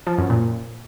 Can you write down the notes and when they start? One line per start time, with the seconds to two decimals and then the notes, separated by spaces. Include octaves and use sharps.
0.07 F3
0.18 F#2
0.30 A#2